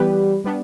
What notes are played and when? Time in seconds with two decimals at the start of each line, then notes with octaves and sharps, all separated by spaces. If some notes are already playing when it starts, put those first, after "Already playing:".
Already playing: E3 G3 B3 G4 B4
0.44 G3 B3 D4